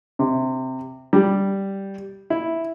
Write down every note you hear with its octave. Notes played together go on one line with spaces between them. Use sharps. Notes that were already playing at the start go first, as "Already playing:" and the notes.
C3
G3
E4